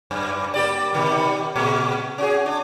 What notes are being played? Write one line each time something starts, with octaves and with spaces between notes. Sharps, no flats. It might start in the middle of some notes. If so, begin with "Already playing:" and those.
F#2
A#3 G4 D5
B2 D#3 G3
A#2 G#3
C#4 F#4 G#4
D4